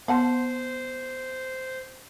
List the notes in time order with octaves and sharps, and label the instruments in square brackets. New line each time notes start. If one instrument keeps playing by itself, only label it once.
[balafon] B3 C6 [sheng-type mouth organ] C5 [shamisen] F5 F#5 A5